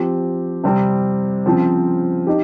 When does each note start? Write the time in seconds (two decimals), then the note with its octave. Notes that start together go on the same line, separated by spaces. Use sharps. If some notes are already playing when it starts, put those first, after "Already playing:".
Already playing: F3 C4 G4
0.64 C3 G3 C4
1.46 C#3 F3 C4
2.27 D#4 G4